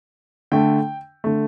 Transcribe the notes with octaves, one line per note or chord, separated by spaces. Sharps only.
D3 A3 G5
D3 A3